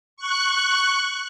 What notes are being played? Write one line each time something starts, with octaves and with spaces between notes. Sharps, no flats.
C#6 F#6